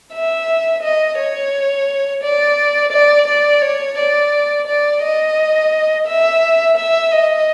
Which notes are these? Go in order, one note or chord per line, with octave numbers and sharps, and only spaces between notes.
E5
D#5
C#5
D5
D5
D5
C#5
D5
D5
D#5
E5
E5
D#5